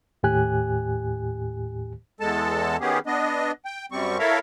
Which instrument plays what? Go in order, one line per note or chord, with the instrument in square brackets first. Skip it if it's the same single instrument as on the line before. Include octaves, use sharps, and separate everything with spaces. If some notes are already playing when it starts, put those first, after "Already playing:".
[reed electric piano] D#2 A2 G4 G#5 F#6
[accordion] E2 G#3 A4 A5
D#3 B3 C#4 G4 G#4
B3 D4 D#5
G5
F#2 G3 C4 C#6
E4 A4 A#4 C#5 E5 F5